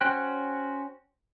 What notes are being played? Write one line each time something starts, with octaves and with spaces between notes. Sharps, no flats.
C#4 F#4 C5 G5 F#6